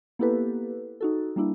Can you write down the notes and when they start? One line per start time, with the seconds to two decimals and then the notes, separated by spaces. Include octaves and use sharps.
0.19 A#3 B3 E4 G4 A4 B4
1.01 D#4 F#4 A4
1.36 G3 A#3 D4 E4